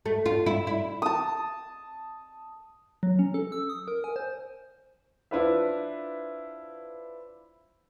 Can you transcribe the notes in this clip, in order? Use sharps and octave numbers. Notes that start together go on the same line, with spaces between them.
A3
F4
E4
E4
A5 D#6
F#3
C#4
A4
E6
D#6
A#4
G#5
C5
D4 E4 F4 B4 C5 E5